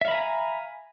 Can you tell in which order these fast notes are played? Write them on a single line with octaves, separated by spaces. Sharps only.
E5 F5 B5 A#5 G#5